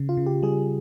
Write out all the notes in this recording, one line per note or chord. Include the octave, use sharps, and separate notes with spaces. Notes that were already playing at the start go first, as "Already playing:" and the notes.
Already playing: C#3
F4
C#3
G4
G3 G#4